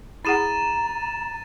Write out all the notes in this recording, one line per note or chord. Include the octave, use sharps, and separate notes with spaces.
E4 G#4 F#5 A#5 A6 D#7 E7